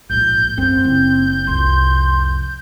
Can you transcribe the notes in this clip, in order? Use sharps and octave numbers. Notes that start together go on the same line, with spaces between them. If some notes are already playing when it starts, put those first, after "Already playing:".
A#1 G#2 G6
F#2 C4 G6
F#1
C2 F2 C6